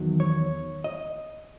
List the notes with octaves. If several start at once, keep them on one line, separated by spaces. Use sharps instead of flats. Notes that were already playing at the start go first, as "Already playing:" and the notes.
Already playing: E2 D#3 F#3
C#5
D#5